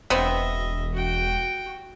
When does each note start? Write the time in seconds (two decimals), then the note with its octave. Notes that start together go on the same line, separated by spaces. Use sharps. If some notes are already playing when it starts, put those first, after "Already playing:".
0.10 E1 B3 C4 D#5 E5
0.93 F#4 G5